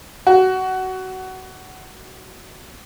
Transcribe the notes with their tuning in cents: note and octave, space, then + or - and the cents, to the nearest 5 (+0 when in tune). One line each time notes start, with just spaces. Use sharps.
F#4 +20